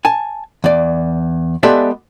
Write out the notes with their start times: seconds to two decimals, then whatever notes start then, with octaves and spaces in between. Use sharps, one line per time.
0.05 G#5 A5
0.64 E2 D5
1.63 G#3 B3 G4 A4 D5 E5